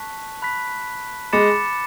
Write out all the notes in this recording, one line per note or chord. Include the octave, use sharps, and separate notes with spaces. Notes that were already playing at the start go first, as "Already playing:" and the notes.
Already playing: A5 C#6 F#6 B6
B5 F#6 B6
G#3 B5 D6 A6 C#7 E7